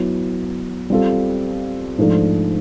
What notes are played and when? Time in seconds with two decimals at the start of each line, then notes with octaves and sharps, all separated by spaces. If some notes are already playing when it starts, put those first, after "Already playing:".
Already playing: F#3 B3 E4
0.90 G3 C4 F4 A4
1.98 G#2 F3 A3 D4